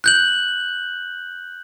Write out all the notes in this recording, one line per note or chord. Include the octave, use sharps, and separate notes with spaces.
F#6 G6 F#7